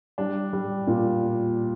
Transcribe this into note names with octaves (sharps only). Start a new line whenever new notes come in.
G3 D4
G3
A#2